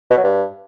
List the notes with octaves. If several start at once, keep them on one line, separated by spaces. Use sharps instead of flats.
B2
F#3
G2